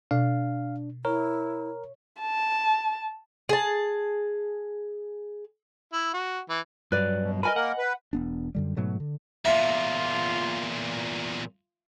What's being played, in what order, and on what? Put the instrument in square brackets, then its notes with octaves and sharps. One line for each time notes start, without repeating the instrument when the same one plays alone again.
[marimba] B2 [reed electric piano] D4 [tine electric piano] F5
[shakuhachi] E4 [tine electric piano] A#4 [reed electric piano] C#5
[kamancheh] A5
[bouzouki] G#4 A5
[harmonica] E4
F#4
E3
[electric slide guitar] G2 F#3 [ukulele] B4 D5
[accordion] B2
[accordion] A#4 [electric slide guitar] B4 [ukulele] D#5 G#5 B5
[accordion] A#3 A#4 [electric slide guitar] F#5
[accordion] B4
[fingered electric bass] E1 B3 D4
F#2 D3 G3
G#2 B2 F#3 A3
D3
[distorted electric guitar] E2 A#2 [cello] F4 [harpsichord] E5